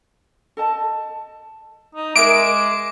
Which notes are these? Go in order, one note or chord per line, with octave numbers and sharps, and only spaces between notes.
A4 D#5 A5
D#4
G#3 A#4 E5 D6 D7